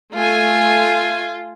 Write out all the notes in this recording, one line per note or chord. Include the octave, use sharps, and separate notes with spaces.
A3 F4 G#5